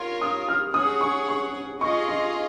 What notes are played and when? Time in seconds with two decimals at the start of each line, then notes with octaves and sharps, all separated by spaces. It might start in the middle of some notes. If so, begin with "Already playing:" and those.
Already playing: F4 A#4 C#5 C6
0.21 D#6
0.49 F6
0.74 C#4 G#4 C#5 F#5 D#6
1.01 C#6
1.29 C#6
1.81 F4 G#4 D#5 C#6
2.08 C6